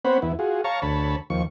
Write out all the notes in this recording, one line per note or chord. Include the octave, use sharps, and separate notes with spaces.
B3 C4 C5 C#5 F#5 B5
E2 B3 E4
F4 F#4 G#4
C#5 F5 A5 A#5 C#6
D2 C#5 A5 B5
D#2 F3 C#6